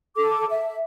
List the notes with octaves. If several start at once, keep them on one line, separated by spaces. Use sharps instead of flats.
A4 D6
E5